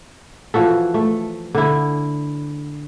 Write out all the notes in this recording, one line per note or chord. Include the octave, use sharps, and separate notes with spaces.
E3 F3 F#4 A4
A3
D3 E4